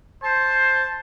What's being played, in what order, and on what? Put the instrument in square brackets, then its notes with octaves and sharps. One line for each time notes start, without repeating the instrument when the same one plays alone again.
[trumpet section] C5 [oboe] A5